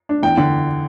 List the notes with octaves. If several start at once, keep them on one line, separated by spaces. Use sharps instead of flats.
D4
E2 G5
D3